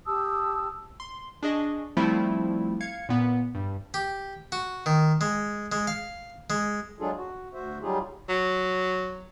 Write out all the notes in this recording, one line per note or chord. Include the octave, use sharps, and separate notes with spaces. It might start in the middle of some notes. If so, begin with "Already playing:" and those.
G4 A5 D#6 E6
C6
D4 G#4 D#5 C#6
F3 G3 A3 C4 E4 F4
F5 G#6 C#7
A#2 B3
G2
G4
F#4
D#3
G#3
G#3
F5
G#3
F#3 G#3 D4 F4 G#4 A4
F#4
D2 F#4 C5 E5
F#3 G3 D#4 F4 G4 G#4
F#3